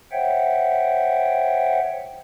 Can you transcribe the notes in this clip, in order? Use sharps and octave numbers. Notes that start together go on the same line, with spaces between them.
C5 C#5 E5 F#5 G5